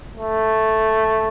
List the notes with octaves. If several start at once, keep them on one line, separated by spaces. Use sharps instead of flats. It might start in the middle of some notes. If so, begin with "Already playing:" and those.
A3